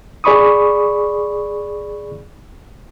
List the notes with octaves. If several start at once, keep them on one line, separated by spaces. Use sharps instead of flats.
G#4 D5 B5 C#6 D#6